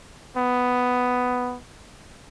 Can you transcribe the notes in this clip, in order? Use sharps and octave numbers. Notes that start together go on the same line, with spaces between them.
B3